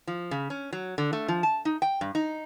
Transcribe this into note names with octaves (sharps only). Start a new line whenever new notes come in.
F3
C#3
C#4
F#3
D3
A3
F3
A5
D#4
G5
G2
D#4